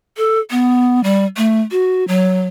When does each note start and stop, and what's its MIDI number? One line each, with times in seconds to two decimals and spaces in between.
0.17 0.39 69
0.51 1.02 59
1.04 1.25 55
1.37 1.60 57
1.71 2.06 66
2.08 2.47 54